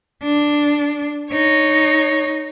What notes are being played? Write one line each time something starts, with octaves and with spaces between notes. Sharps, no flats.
D4
D#4 C#5